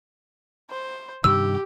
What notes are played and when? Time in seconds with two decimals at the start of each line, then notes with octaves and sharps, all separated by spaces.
0.70 C5
1.24 G2 C3 D#3 G4 E6